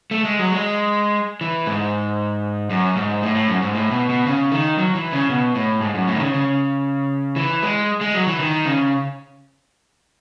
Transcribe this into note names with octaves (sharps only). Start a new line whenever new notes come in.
A3
G#3
F#3
G#3
E3
G#2
F#2
G#2
A2
A2
F#2
G#2
A2
B2
B2
C#3
D#3
F#3
E3
C#3
B2
A2
G#2
F#2
A2
D#3
C#3
C#3
E3
G#3
G#3
F#3
E3
D#3
C#3